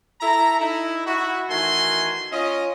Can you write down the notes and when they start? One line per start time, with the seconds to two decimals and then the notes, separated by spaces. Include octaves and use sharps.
0.21 E4 A4 A#5
0.60 D#4 E4
1.07 E4 F#4
1.49 D#3 E3 A3 F#4 G#5 C6
2.32 C#4 F4 D#5